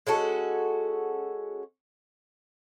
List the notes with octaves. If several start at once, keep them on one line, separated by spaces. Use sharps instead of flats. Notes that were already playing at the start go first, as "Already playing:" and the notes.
G#3 C#4 F#4 A4